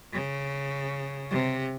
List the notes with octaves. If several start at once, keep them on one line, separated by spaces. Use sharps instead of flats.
C#3
C3